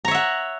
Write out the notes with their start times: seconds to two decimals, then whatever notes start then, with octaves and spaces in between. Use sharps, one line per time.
0.05 A#5
0.08 C#5
0.11 E5
0.15 F#5